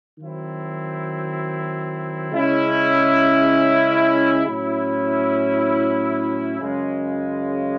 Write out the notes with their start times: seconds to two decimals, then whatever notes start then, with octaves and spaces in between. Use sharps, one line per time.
0.19 D#3 F#3 C4 E4
2.32 C#3 G#3 C#4 E4
4.46 A2 F#3 C#4 E4
6.59 F#2 C#3 G#3